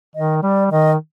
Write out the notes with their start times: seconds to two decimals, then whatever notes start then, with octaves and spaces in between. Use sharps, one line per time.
0.15 D#3 D#5
0.43 G3 D5
0.71 D#3 D#5